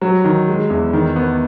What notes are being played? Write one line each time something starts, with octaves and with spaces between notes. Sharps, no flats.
F#3
D#3
G#3
E2
D#3
B3